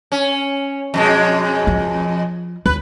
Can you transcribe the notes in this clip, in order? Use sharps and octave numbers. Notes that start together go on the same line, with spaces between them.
C#4
F2 B2 G#3
F3
D#2 B4